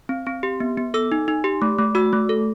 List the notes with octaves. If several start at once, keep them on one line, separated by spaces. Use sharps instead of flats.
C4
C4
G4
B3
B3
A4 E6
D#4
D#4
G4
A3
A3
F#4 E6
A3
A4